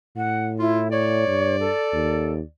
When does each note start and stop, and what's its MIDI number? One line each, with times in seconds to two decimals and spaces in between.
0.17 1.23 45
0.17 0.47 78
0.59 0.91 64
0.59 0.82 65
0.91 1.56 73
0.91 2.47 74
1.28 1.70 43
1.60 2.31 69
1.94 2.41 39